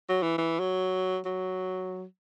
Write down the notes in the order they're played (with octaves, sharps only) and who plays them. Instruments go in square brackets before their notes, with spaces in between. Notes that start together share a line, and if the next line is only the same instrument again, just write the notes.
[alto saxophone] F#3
E3
E3
F#3
F#3